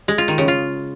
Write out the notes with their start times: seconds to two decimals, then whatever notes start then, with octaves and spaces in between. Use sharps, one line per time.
0.08 G#3
0.18 F4
0.28 D#3
0.38 C#3
0.48 F4